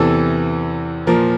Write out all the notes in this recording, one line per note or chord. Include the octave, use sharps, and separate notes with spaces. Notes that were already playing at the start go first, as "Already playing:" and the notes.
Already playing: E2 C3 E3 A4
A#2 F3 A#4